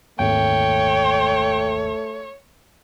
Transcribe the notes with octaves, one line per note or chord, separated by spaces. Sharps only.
G#1 D#2 A3 C#5 G5